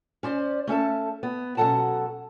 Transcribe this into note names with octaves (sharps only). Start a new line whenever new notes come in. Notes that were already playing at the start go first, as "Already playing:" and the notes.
C#4 C5 D5
A3 C#4 A4 A5
B3
B2 F#3 C#4 A4 F#5 A5